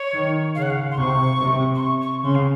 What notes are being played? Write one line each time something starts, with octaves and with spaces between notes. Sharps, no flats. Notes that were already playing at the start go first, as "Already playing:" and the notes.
Already playing: C#5
D#3
C#3 F5
F#5
F5
C6
C3 C#6
C3
C6
C#6
C#6
C#3 C6
F5